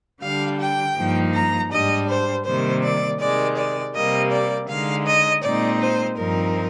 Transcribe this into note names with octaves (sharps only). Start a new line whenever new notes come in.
D3 G3 D4 F5
G5
G2 F3 A#3 D#4
A#5
G#2 G3 D4 D#5
C5
C3 D#3 G3 A#3 C5
D5
C3 D#3 G#3 D5
D5
C3 G3 A#3 D#5
D5
D3 G#3 D#4 F5
D#5
A#2 G#3 C4 D#4 D5
C5
G2 F3 C4 D#4 A#4